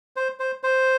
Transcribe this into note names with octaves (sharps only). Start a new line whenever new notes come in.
C5
C5
C5